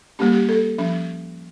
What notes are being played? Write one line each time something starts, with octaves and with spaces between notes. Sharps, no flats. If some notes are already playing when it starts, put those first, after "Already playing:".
G3 A#3 C#4 G4
G4
A4
F3 C#4